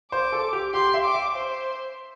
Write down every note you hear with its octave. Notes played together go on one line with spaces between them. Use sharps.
C5 D6
A4
G4
G4 C6
G5
E5
D6
E5
C5